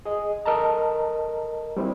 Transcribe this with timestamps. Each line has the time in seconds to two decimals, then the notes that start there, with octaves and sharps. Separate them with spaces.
0.05 G#4 D#5
0.46 A4 A#4 D#5 A5 A#5
1.77 G3 C4 E4